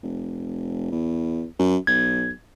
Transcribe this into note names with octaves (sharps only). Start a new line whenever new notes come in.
F1
E2
F#2
B1 G#6